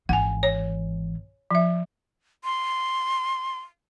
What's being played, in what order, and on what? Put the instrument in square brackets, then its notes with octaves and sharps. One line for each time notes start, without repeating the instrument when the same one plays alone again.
[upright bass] G#1 E3 [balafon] F#5 G#5
[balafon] C#5
F3 E5
[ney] C6